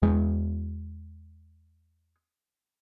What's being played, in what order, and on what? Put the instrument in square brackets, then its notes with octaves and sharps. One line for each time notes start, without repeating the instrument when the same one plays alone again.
[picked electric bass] E2 G#3